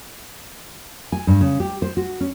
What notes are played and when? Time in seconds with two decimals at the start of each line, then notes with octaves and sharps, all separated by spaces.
1.12 G#5
1.27 G2
1.41 C#3
1.60 G4
1.82 C5
1.97 F#4
2.20 C#4